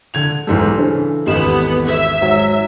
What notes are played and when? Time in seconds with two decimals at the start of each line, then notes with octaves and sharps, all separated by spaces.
0.14 D3 G#6 F7
0.47 B1 G#2 E3 G3 A4
0.78 C#3 D4 C5
1.27 G#1 E2 B3 G4 D#5 E7
1.88 E5
2.21 G#2 F#3